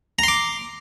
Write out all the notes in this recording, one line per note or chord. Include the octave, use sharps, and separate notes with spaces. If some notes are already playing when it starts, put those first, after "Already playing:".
A#5 C6 D6